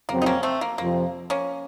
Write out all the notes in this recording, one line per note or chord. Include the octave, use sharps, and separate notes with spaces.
F2 C#3 F#3 A#3 C4
D#4
A#3 C#4
A3 C4
A#3
F2 C3 F3 A#3 C4
A#3 C#4